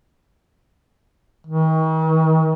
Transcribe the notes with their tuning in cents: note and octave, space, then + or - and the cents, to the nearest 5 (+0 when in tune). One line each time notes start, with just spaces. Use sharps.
D#3 +40